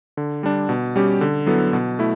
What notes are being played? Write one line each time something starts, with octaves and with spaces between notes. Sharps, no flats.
D3
G3 D4
B2
G3 C#4 G4
D3
F#3 B3 E4 A4
B2
A3 E4